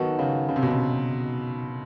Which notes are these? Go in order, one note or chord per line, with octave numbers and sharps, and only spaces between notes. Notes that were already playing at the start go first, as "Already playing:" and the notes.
Already playing: D#3 F#3 B3 D#4 F#4 A4
C#3
C#3
C3
B2
C3